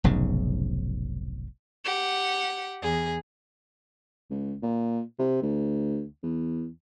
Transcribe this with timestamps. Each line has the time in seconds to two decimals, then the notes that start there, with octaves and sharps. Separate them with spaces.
0.04 F1 B1 G#2 C#3
1.84 G4 F#5
2.81 E2 G#4
4.30 C#2
4.63 A#2
5.19 C3
5.42 D2
6.23 E2